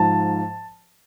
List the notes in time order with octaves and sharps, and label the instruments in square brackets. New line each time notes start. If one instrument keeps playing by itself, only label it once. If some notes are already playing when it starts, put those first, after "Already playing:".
Already playing: [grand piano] G#2 F3 A5